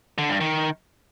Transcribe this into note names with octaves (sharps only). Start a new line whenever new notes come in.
D3
G2
D#3